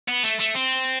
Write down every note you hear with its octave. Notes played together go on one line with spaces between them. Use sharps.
B3
A3
A3
C4